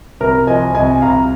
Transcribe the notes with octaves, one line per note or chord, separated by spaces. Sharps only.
C2 A#4
F3 D#5 G#5
C2 D#5 G#5
C2 F5 A#5